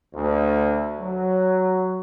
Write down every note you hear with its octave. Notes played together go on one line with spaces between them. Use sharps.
D2
F#3